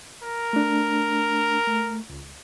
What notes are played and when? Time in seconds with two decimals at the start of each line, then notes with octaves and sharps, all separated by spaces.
0.24 A#4
0.53 A3 D4
1.67 A3
2.10 C#2